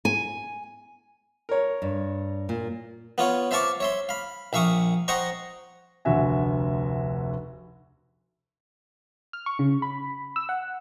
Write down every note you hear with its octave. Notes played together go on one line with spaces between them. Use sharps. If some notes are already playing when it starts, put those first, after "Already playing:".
G#5
A#4 C#5
G2
A#2
B3 F4 C#5
C5 E5 F5 A5 C#6 D6
C#5 E5 C6
F5 B5
A#1 E5 F5 C#6 D#6
C5 D#5 F#5 G5 A#5 C#6
F1 D2 F#4 E5 G#5
F6
C#6
C#3
B5
E6
F#5